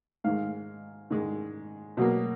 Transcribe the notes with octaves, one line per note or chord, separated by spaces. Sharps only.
G#2 D#3 G#3 F5
G#2 D#3 G#3
B2 F#3 A#3